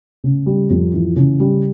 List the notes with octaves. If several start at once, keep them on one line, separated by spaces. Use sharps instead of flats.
C#3
G3
F2
E3
C#3
G3